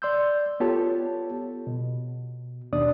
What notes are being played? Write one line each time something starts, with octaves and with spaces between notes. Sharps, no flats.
D5 C6 E6 G6
B3 F4 G4 A4 C#5 A5
B2
D#2 B2 D4 D5 D#6